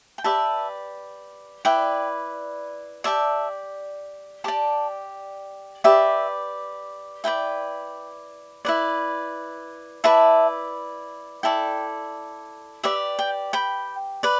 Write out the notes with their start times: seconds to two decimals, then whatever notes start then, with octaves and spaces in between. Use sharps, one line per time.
0.18 G5
0.24 G4 B4 D5 E5 A5
1.65 E4 B4 D5 G5
3.04 G4 D5 E5 A5
4.44 G4 D5 A5 D6
5.84 G4 B4 D5 E5
7.24 E4 B4 D5 G5
8.65 E4 B4 D5
10.04 E4 B4 D5 E5 A5
11.43 E4 A4 D5 G5
12.83 G4 B4 D5 E5
13.19 G5
13.53 G5 B5
14.23 B4 D5